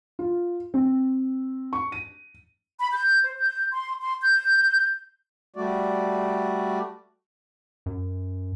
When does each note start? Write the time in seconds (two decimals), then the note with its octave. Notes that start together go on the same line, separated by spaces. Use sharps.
0.19 F4
0.74 C4
1.73 C#6
1.92 D#7
2.80 B5
2.93 G6
3.25 C5
3.39 G6
3.72 C6
4.01 C6
4.22 G6
5.56 G3 A3 F#4 D5
7.86 F#2